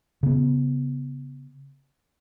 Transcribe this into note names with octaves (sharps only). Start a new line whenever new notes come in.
C#3 B3